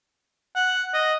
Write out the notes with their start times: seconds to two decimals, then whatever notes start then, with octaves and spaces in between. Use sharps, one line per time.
0.56 F#5
0.94 D#5